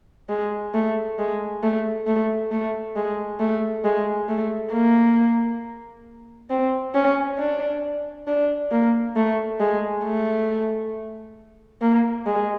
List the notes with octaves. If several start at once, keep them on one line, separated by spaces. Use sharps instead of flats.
G#3
A3
G#3
A3
A3
A3
G#3
A3
G#3
A3
A#3
C4
C#4
D4
D4
A#3
A3
G#3
A3
A#3
G#3